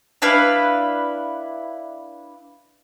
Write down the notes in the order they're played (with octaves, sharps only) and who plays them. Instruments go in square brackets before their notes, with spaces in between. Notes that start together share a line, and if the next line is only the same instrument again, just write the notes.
[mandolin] D4 E4 B4 F5